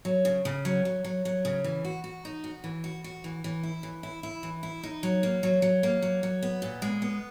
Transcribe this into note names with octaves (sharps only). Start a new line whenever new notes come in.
F#3
C#3
C#3
F#3
F#3
F#3
F#3
C#3
E3
F#4
F#4
D#4
F#4
E3
F#4
F#4
E3
E3
E4
E3
E4
E4
E3
E4
D#4
F#3
A#3
F#3
F#3
A#3
F#3
F#3
B3
A#2
G#3
B3